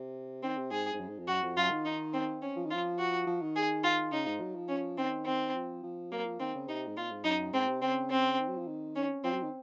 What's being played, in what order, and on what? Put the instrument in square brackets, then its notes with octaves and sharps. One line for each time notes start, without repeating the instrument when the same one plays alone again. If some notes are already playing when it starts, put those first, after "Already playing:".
Already playing: [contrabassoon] C3
[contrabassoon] D#3 [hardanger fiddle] C4
[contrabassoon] C3
[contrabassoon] G#2 [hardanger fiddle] G#4
[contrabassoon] G#2
F#2
G#2
F2
[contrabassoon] F#2 [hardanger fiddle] F#4
[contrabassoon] F2
[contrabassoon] F#2 [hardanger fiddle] F4
[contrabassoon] D#3
[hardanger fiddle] D#4
C4
C#4
[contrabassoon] F3
D#3
[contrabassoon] F3 [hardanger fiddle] F4
[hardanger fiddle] F#4
[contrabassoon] F3
D#3
[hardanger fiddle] G#4
F4
[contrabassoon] C#3 [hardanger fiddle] D#4
[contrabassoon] G#2
F#3
F3
[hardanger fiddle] C#4
[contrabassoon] D#3 [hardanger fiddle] C4
[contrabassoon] D#3 [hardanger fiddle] C4
[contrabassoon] F3
F3
[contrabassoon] F#3 [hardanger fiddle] A#3
[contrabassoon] F3
[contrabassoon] D#3 [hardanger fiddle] C4
[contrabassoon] C#3
[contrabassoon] C3 [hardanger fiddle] D#4
[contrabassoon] G#2
[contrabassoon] A#2 [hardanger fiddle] F4
[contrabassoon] G#2
[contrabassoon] F#2 [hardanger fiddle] D#4
[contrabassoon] G#2 [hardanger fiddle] C4
[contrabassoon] C3
[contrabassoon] C#3 [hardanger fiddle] C4
[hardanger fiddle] C4
[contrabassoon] D#3
F#3
F3
D#3
[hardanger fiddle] C#4
[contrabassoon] F3 [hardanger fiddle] C4
[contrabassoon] F#3
D#3